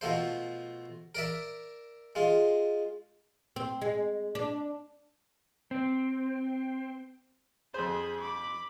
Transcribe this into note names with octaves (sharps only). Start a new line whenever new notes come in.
B2 F3 A3 C5
A#4 D5 E5
G#3 F4
C4
G#3
D4
C4
F2 G#4 C5 B5
B5 D6